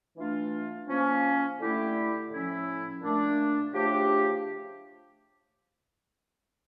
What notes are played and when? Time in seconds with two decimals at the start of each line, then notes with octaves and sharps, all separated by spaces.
0.16 E3 A3 D4 F4
0.88 F3 A#3 C#4
1.59 D3 A3 E4 G4
2.31 A2 F3 C#4 E4
3.01 A#2 A3 D4
3.73 C#3 F3 A3 D4 G4